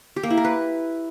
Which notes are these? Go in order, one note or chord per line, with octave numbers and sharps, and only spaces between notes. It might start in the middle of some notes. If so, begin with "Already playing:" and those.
G4
A#3
E4
A#4
B4